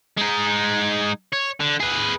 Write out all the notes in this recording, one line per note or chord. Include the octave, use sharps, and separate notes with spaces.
G#3 D#4
C#5
D3
G#4 B4